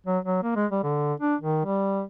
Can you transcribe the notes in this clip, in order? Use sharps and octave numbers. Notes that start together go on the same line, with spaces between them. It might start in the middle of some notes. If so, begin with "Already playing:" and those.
F#3
F#3
A#3
G#3
G3
D3
D4
D#3
G3